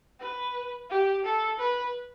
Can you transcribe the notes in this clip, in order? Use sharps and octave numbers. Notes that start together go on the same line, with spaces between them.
B4
G4
A4
B4